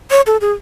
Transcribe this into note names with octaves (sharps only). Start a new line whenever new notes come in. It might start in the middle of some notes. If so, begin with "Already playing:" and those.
C#5
A4
G#4